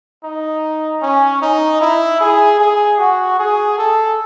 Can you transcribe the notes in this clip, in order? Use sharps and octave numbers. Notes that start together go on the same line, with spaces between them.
D#4
C#4
D#4
E4
G#4
G#4
F#4
G#4
A4